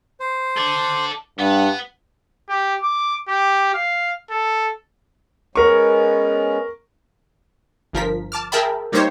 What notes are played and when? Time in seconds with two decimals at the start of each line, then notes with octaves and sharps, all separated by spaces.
0.20 C5
0.57 A4 D5
1.39 G2 B3 F#5
2.49 G4
2.82 D6
3.28 G4
3.74 F5
4.30 A4
5.56 G#3 B3 C#4 A#4 C#6
7.93 G1 F3 A#4 B6
8.32 A5 D6 F6
8.52 G#4 A#4 E5 G5 A5 B5
8.92 G3 A#3 D#4 G4 C5 C#5